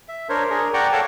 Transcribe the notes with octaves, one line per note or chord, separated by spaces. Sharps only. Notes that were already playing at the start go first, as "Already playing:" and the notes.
E5
D4 A#4 C5 C#5
D4 G#4 A#4
D5 F#5 G5 A#5 C#6
A4 C#5 D5 F5 F#5 A5